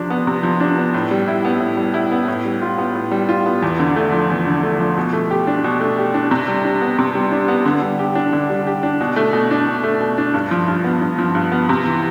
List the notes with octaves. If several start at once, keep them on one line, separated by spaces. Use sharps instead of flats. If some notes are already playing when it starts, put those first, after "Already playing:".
Already playing: C3 F3 D4
B3
C3
F3
D4
B3
A2
G3
E4
B3
A2
G3
E4
B3
A2
G3
F4
B3
A2
G3
F4
B3
E2
D3
A3
F3
E2
D3
A3
F3
B2
A3
G4
D4
B2
A3
G4
D4
C3
G3
D4
B3
C3
G3
D4
B3
D3
G3
G4
D4
D3
G3
G4
D4
B2
A3
B2
D4
B2
A3
B2
D4
G2
F3
G2
B3
G2
F3
G2
B3
C3
E3